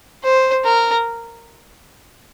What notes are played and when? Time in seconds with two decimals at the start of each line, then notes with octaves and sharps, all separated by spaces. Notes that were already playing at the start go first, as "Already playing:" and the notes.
0.24 C5
0.64 A#4